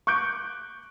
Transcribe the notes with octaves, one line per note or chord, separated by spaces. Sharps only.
C#6 D6 F#6 G6 D7